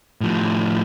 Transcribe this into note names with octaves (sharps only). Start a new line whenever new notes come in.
A2 F3